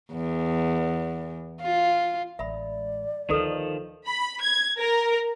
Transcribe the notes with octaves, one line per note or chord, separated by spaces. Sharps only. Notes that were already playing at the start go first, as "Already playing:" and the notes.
E2
F4
A1 G#3 D5 E5 B5
D2 D#3 F3 A4 B4
B5
G#6
A#4